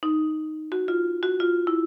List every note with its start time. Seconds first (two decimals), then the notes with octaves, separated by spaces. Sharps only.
0.03 D#4
0.72 F#4
0.88 F4
1.23 F#4
1.40 F4
1.67 E4